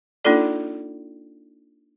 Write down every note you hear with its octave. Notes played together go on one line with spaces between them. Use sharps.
A#3 D4 D#4 F4 A4 D5